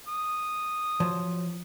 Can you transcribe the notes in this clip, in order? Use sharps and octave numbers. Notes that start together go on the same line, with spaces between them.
D#6
F3 F#3